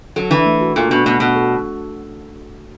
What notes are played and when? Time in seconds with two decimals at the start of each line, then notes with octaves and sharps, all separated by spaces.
0.16 F#3 A4
0.31 E3 D4
0.45 A3
0.61 F#4
0.76 A#2 A4
0.91 B2 D4
1.06 B2 A3
1.20 B2 F#4
1.36 A4